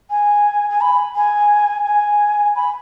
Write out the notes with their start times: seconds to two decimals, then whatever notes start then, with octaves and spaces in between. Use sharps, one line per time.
0.10 G#5
0.70 G#5
0.81 B5
1.15 G#5
1.85 G#5
2.55 B5